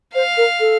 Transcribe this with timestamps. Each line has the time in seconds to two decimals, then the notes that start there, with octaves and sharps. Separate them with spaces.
0.15 C5 F5
0.37 A#4
0.60 A4